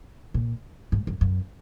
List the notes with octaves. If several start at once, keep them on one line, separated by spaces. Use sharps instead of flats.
A#2
G#2
F#2
F#2